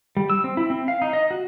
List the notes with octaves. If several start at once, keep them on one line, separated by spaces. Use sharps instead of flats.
G3
E6
C4
E4
C4
F5
D#4
D#5
F#4